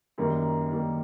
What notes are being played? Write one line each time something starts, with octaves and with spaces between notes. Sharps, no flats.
F#2 D#3 G3 A#3
F#2 D#3 G3 A#3